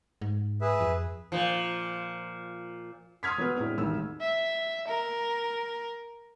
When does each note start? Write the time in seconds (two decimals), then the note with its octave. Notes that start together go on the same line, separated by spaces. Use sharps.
0.21 G#2
0.61 G#4 B4 E5
0.80 F2
1.32 A#2 F3
3.23 C6 D#6 F6 G#6 B6
3.38 F#3 B3 B4
3.56 A2 G#3 C4 D4
3.78 E1 A1 D#3 E6
4.21 E5
4.88 A#4